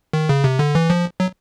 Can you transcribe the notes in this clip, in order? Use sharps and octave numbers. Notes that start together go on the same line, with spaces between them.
D#3
C#3
C3
D3
E3
F3
F#3